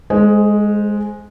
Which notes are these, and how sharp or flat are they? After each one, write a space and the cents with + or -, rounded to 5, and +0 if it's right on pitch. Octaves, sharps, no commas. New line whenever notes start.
G#3 +0 A4 -45 C5 +0